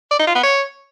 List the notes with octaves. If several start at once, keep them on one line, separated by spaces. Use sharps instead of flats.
D5
D#4
F4
B3
C#5